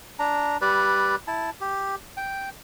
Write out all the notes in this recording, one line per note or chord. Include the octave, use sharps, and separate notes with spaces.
D4 A#5
G3 B4 D5
E4 A5
G4
G5